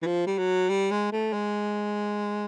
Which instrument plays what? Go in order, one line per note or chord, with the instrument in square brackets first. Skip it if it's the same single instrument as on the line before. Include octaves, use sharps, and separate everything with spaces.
[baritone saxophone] E3
F3
G3
F#3
G3
G#3
A3
G#3